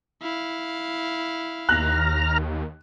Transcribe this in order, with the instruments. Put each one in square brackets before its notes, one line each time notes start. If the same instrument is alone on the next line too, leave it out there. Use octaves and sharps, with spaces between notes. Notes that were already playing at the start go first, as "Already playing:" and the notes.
[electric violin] E4 F5
[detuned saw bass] D#2 [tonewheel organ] A#5 F6 [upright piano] F#6